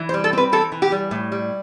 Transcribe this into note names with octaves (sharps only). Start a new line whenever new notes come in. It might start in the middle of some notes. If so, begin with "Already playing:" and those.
Already playing: E3
C5
G3
A4
C4 B4
E3 A4
E3
G4
G3
A2
G3